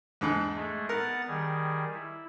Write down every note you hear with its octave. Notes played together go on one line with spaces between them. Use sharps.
E2 G#2 D3
G#3 A3 G#4
B3 A#4 F#5 A6
D#3 G3 G#4
E4